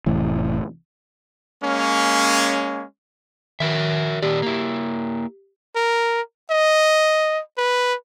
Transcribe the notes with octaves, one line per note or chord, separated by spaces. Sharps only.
F1 A2 E3
G#3 A#3 C#4
D#3 F#4 A#4 E5
A#2 D#3 G4 D5
A#3 E4
A#4
D#5
B4